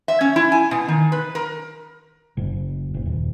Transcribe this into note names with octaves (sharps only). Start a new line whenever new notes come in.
E5
C#4
E4
G#5
B2
D#3
B4
A#4
F#1
F#1
D#1